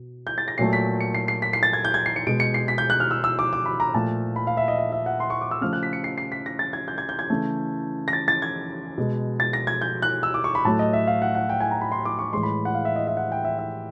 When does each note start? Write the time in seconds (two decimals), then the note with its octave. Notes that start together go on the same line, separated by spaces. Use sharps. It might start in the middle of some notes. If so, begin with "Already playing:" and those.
Already playing: B2
0.27 G6
0.38 A6
0.48 A#6
0.58 A#2 F#3 A3 C7
0.73 B6
1.01 C#7
1.14 C7
1.28 C7
1.42 B6
1.53 C7
1.63 A6
1.73 G#6
1.85 G6
1.94 G#6
2.06 C7
2.16 C#7
2.27 B2 G#3 D7
2.40 C#7
2.54 C7
2.68 B6
2.78 G6
2.90 F#6
3.00 F6
3.11 E6
3.24 E6
3.39 D6
3.53 D6
3.66 B5
3.80 A#5
3.94 A#2 F3 A3 A5
4.36 B5
4.47 F5
4.57 E5
4.68 D#5
4.78 E5
4.92 E5
5.06 F#5
5.20 C6
5.30 C#6
5.41 D6
5.51 E6
5.61 C#3 F3 A3 F6
5.73 F#6
5.83 B6
5.93 C#7
6.04 C7
6.18 C7
6.32 B6
6.46 A#6
6.59 A6
6.73 G#6
6.88 G6
6.98 G#6
7.09 G6
7.19 G#6
7.30 C#3 E3 A3
8.08 A#6
8.13 A6
8.28 A6
8.42 G#6
8.98 B2 G#3
9.40 A6
9.53 A#6
9.67 G#6
9.81 G6
10.02 F#6
10.23 E6
10.34 D6
10.44 C#6
10.55 B5
10.65 A2 F#3 A3 A5
10.79 D#5
10.93 E5
11.07 F5
11.22 F#5
11.35 F#5
11.49 G5
11.60 G#5
11.71 A#5
11.81 B5
11.92 C6
12.05 D6
12.19 C#6
12.33 A2 E3 G#3 C6
12.43 B5
12.65 F#5
12.75 F5
12.85 E5
12.96 D#5
13.07 E5
13.17 F#5
13.32 G5
13.45 E5
13.59 E5